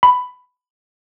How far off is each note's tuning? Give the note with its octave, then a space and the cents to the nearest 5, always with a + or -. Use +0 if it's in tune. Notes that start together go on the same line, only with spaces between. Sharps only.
B5 +10